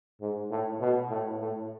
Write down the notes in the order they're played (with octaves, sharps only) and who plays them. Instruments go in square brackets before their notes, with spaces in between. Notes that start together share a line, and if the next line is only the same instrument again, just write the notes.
[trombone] G#2
A2
B2
A2
A2